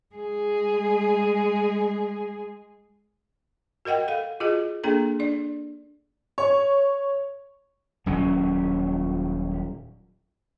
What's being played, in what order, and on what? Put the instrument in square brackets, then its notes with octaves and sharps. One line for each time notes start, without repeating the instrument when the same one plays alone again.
[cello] G#3 G#4
[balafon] F#4 A#4 D#5 F#5 G5
A4 F5
F4 F#4 G#4 D#5
A#3 D4 G#4 A4 A#5
D4 D5
[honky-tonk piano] C#5
[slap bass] D#1 F#3 C#4